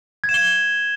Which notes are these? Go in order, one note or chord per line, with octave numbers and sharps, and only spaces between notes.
G#6
E7
G7